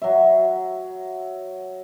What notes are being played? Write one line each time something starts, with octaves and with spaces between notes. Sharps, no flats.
F#3 E5